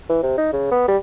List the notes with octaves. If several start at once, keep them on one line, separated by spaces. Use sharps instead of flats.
E3
C3
D#4
C#3
B3
G3